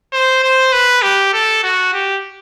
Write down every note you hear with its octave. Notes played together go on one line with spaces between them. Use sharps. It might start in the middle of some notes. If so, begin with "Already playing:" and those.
C5
C5
B4
G4
A4
F#4
G4